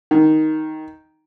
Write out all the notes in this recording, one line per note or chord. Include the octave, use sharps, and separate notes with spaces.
D#3